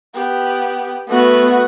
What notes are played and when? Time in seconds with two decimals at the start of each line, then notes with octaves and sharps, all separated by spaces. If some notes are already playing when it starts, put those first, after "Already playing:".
0.14 B3 G4
1.09 A3 B3 F#4